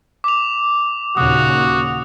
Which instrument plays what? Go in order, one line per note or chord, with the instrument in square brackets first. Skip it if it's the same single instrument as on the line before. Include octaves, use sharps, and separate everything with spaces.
[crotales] D6 F7
[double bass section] D#2 A#2 C#3 [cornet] F#4 [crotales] D#6